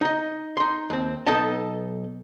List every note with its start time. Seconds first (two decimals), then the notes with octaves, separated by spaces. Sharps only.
0.01 D#4 D#5
0.57 D#4 C6
0.90 D#2 C4
1.27 B1 B3 D#4 A4 D#5 A5